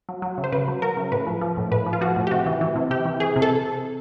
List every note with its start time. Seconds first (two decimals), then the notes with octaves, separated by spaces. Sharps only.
0.09 F#3
0.22 F#3
0.38 C#3
0.44 C5
0.52 C#3 B4
0.68 F#3
0.82 F#3 A#4
0.97 C#3
1.12 A2 B4
1.27 F3
1.41 F3
1.57 A2
1.71 A2 B4
1.86 F3
1.93 F4
2.01 F3 F#4
2.16 A2
2.27 G4
2.31 C3 F#4
2.46 E3
2.61 E3
2.76 C3
2.91 C3 G4
3.05 E3
3.20 E3 G#4
3.36 C3
3.42 A4